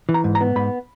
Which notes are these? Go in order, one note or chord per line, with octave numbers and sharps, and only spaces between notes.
E3
A#5
G#2
A#5
B3
G#2 B5